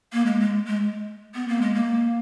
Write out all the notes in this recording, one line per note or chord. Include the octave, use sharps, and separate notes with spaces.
A#3
G#3
G#3
G#3
B3
A#3
G#3
A#3